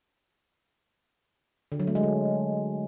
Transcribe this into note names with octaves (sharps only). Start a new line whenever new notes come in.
D3
F#3
A3
G#3
D3